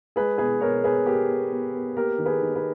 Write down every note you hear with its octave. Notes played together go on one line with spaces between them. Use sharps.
G#3 G#4 B4
B2 G#4 B4
B2 A#4 C#5
B2 G#4 B4
B2 G4 A#4
B3
B3
B3
A#3 G4 A#4
D#3
G#4 B4
D#3
G#4 B4